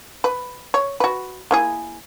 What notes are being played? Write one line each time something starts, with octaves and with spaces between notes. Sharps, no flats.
B4
C#5
F#4 B4
A#3 E4 G#4